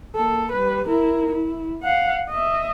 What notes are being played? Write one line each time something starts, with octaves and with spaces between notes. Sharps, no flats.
A#3 A4
G3 B4
E4 A#4
E4
F5 F#5
D#5 E5